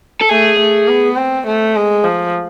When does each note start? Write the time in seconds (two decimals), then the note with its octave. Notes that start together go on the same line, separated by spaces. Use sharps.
0.21 A4
0.30 A3 G#4
0.60 A3
0.89 B3
1.17 C4
1.47 A3
1.76 G#3
2.04 F3